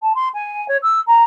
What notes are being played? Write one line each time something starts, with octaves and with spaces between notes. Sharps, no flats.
A5
C6
G#5
C#5
E6
A#5